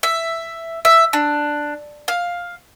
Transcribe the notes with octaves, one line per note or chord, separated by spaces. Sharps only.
E5
E5
D4
F5